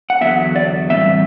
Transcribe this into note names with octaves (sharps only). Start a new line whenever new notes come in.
F#5
E2 D3 F#3 B3 E5
D5
A2 E3 G3 C4 E5